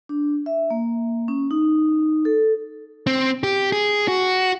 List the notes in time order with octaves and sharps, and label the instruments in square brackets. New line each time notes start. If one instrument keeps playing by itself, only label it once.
[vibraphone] D4
E5
A#3
C#4
D#4
A4
[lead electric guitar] C4
G4
G#4
F#4